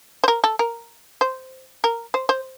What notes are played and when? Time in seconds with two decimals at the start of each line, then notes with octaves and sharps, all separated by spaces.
0.24 C5
0.28 A#4
0.44 A4
0.59 A#4
1.21 C5
1.84 A#4
2.14 C5
2.29 C5